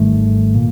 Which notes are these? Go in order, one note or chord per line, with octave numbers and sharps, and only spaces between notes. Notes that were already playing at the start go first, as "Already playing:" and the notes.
Already playing: G#1 G#2 D#3 G3 A3
A#2 A#3